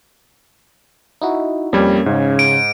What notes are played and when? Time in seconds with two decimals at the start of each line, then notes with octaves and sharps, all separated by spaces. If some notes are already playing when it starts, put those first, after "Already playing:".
1.22 D#4 E4 F#4
1.73 F2 G3 A#3 C#4 G#6
2.06 G#2 C#3
2.39 D7